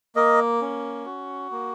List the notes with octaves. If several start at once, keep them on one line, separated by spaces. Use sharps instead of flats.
A#3 A#4 D#5
C#4
F#4
A#3